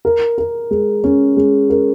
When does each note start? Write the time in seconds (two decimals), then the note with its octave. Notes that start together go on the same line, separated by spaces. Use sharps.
0.05 A#4
0.38 A#4
0.71 G#3
1.04 C#4
1.37 G#3
1.70 A#4